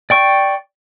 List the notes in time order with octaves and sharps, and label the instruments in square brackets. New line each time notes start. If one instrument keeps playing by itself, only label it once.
[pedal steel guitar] D5 G5 C#6